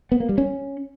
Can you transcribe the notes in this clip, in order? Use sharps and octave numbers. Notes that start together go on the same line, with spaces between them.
B3
A#3
G3
C#4